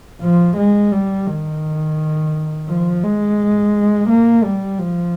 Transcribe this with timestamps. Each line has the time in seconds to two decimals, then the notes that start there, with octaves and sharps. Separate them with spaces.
0.22 F3
0.57 G#3
0.92 G3
1.27 D#3
2.68 F3
3.03 G#3
4.09 A#3
4.44 G3
4.79 F3